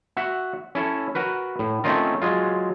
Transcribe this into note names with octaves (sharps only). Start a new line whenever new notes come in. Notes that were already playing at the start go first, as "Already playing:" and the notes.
F#4 E5 F#5
C#4 E4 A4
F#4 A#4 B4
A2
A3 C4 C#4 D#4 F4 A#4
F#3 G#3 F4